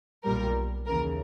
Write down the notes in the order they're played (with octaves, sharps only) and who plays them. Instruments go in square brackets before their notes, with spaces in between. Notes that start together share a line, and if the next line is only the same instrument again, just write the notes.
[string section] B1 A#2 G3 A#4
D#2 C#3 E3 A#4